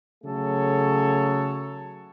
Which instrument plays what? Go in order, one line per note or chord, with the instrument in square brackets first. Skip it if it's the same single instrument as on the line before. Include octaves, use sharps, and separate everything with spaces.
[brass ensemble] C#3 F#3 A3 G#4 A4 C#5